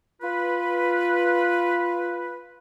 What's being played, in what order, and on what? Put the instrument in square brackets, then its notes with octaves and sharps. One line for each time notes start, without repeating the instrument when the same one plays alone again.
[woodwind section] F4 B4